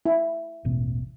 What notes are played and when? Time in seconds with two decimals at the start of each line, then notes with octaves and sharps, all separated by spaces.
0.06 E4
0.65 E1 A1 B2